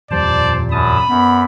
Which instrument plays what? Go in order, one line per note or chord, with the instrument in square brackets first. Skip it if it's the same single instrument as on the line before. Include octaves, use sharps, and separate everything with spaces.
[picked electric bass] D#1 F2 G3 [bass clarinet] A#2 [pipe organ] C5 A5 [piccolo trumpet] D5
[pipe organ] F#2 A5 D#6 [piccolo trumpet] B5
[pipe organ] F#2 [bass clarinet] B3